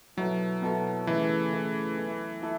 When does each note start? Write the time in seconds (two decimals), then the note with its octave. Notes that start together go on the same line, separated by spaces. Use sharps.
0.17 B2 F#3 B3 E4 A4
0.62 B2 B3 E4 A4
1.07 C#3 E3 A3 E4 B4
1.52 C#3 A3 E4 B4
1.97 B3 E4 A4 E5
2.42 B3 E4 A4 E5